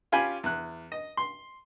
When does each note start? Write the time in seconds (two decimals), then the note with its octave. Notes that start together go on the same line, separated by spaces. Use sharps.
0.12 C#4 F4 G4 G#5 B5
0.44 E2 F#6
0.92 D#5
1.17 C6